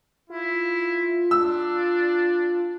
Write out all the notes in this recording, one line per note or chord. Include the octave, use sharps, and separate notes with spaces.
E4 F4
D4 E6